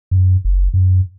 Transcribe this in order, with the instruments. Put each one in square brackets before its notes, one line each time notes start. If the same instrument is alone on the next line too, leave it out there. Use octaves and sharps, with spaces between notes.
[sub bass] F#2
F#1
F#2